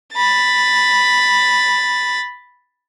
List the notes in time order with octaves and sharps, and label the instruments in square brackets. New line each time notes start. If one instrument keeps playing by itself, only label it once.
[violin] B5 A6